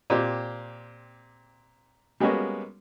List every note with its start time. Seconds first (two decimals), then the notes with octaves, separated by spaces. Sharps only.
0.10 A#2 C4 G4 C5
2.20 G3 G#3 A#3 B3 C#4 F#4